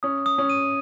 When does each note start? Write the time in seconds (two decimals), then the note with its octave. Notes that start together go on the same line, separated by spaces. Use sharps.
0.03 C#4 D#6
0.26 D#6
0.38 C#4
0.50 D#7